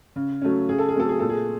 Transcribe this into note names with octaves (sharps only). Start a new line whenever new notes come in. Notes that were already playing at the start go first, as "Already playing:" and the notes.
C#3
F#3 A3 C#4
C#3 G#4
A4
G#4
F#3 A3 C4 A4
G#4
A#2 A4
G#4